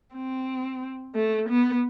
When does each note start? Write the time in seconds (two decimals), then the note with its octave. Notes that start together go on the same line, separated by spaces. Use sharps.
0.15 C4
1.15 A3
1.49 B3